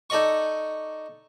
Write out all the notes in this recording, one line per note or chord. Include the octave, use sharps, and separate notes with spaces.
D#4 A4 D5 D#5 C#6